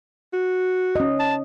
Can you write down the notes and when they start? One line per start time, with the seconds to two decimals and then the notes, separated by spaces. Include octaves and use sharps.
0.33 F#4
0.96 C#4 D#5
1.20 A5